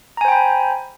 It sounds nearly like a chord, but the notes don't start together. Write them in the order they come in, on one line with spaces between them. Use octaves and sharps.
A#5 G#5 C5 G5 B5